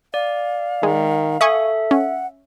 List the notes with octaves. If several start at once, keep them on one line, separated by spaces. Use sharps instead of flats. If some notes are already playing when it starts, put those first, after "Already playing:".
D5 F5
D#3 G#3
A4 E5 G#5 C#6 D#6
C#4 F#5